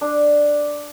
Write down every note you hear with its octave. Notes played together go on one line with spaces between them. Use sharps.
D4